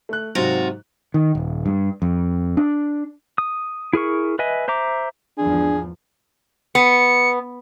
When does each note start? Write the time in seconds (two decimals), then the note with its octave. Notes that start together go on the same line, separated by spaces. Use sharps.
0.09 A3 F#6
0.35 G#2 C3 F#3 F4 F#4
1.14 D#3
1.35 D#1
1.66 G2
2.02 F2
2.57 D4
3.38 D#6
3.93 E4 G#4 A#4 C#6
4.39 B4 D#5 E5 G#5
4.68 C5 E5 A#5 D6
5.38 G#1 E2 F3 D4 G#4
6.75 B3 C#7